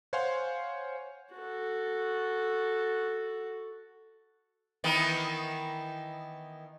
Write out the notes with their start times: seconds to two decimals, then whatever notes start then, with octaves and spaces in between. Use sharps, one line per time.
0.13 C5 C#5 F5 F#5 G#5 C6
1.35 F#4 A4
4.84 D#3 E3 B3